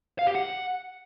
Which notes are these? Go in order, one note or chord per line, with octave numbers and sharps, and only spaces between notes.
F5
G4
F#5